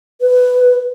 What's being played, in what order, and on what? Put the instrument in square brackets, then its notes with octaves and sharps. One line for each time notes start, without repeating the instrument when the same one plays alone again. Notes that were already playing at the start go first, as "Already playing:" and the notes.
[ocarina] B4